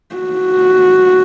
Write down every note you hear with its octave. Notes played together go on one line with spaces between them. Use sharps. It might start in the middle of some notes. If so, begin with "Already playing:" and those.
F#4